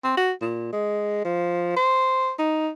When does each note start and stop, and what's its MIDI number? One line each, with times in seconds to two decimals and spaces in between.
0.04 0.16 60
0.17 0.32 66
0.41 0.72 46
0.73 1.21 56
1.25 1.76 53
1.76 2.31 72
2.39 2.70 63